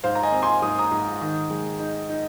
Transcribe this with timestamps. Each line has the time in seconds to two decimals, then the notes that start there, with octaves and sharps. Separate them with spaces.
0.04 G#2 C5 F5
0.15 A#5
0.23 D#5 G#5
0.32 C4
0.42 G#5 C6
0.62 G#2 D#6
0.79 A#5 D#6
0.92 G#2
1.21 D#3
1.50 G#3
1.80 D#4
2.09 D#4